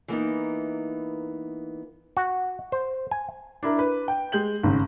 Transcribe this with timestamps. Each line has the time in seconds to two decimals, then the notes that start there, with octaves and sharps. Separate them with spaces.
0.08 E3 A#3 B3 D#4
2.17 F#4
2.72 C5
3.11 G#5
3.63 D4 E4 A#4
3.79 B4
4.08 G5
4.32 G#3 G6 F#7
4.63 G#1 C#3